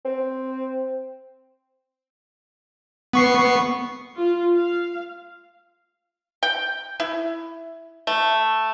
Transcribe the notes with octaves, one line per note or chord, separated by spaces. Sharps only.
C4
B3 C#6 C7
F4
F5
G5
E4
A3